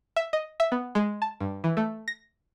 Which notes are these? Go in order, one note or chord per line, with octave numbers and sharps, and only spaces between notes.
E5
D#5
E5
B3
G#3
A5
G2
E3
A3
A#6